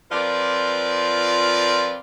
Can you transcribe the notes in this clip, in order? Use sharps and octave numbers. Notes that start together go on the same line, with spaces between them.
F3 C4 F4 A#4 B4 D5